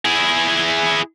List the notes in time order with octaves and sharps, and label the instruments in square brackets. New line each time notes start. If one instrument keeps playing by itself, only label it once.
[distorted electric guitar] E4 G#4